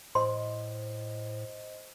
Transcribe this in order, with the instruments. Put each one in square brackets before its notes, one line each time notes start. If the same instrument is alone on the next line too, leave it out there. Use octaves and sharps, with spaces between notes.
[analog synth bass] A2 [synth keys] C5 D#5 [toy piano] C6